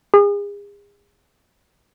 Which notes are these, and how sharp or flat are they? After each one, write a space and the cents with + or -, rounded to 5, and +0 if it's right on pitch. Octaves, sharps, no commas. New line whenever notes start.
G#4 -35